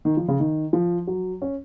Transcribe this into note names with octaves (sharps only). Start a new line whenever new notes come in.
D#3
F3
C#3
D#3
F3
F#3
C#4